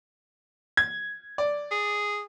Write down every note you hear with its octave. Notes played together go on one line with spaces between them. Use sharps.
G#6
D5
G#4